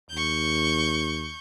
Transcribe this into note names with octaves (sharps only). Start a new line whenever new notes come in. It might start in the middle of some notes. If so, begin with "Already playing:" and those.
D#2 C#6 G6